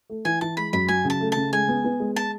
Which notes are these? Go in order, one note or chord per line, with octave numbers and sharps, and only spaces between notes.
A3
E3 G#5
E3 A5
G#3 B5
F#2 B5
F#3 G#5
C#3
A5
A3
C#3 A5
G#3 G#5
B3
B3
G#3
A5